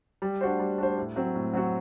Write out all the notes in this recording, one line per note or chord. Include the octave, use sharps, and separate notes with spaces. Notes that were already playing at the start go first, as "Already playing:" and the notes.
G3
D4 F#4 C5
G3
D4 F#4 C5
A2
F#3 C4 F#4
A2
F#3 C4 F#4